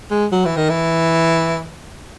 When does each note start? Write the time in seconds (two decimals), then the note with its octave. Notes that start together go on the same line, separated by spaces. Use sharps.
0.11 G#3
0.32 F#3
0.45 E3
0.57 D#3
0.70 E3